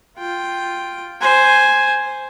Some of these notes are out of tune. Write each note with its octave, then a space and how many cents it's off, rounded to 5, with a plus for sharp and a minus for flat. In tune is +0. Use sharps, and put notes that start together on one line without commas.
F4 +0 G5 +0
C5 +0 G#5 +0